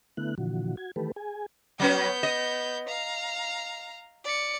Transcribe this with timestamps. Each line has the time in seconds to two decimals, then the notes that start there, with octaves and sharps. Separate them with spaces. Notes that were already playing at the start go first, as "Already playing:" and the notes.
0.17 D3 A3 B3 E4 F#6
0.38 A#2 D3 E3 F3 F#4
0.77 F#4 G#6
0.96 D#3 E3 A3 G4 A4 B4
1.16 G#4 G#5
1.80 F#3 B3 C#4 B4 G6
2.23 D#5
2.88 F5 A#5
4.25 D5 C#7